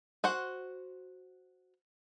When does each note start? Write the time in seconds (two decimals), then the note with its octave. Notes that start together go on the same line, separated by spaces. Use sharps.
0.24 F#4 C5 F#5